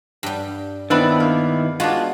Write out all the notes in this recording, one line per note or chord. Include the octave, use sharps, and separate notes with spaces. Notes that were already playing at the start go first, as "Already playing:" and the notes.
G2 G3
D#3 B3 C4 D4 E4 B4
A#3
G#3 B3 D4 F4 F#4